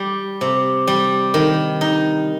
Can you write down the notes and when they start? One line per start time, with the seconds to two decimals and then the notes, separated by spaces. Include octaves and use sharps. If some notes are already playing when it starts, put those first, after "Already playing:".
Already playing: G3
0.41 C3
0.87 G3
1.34 D#3
1.81 D#4